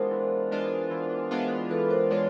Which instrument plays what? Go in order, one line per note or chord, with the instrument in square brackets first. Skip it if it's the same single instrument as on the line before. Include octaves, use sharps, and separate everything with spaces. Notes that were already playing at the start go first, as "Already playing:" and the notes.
Already playing: [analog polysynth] E3 G#3 B3 D4 F4 [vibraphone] A#4 C5
[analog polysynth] E3
G#3 B3 D4 F4
E3
G#3 B3 D4 F4
[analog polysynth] E3 [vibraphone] A4 B4
[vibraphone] A#4 C5
[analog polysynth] G#3 B3 D4 F4 [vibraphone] B4 C#5